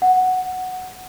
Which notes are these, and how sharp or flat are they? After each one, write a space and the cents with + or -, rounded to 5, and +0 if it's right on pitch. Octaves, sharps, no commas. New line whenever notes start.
F#5 +0